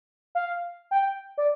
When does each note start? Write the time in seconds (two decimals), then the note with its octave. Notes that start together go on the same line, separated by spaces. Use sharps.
0.35 F5
0.91 G5
1.38 D5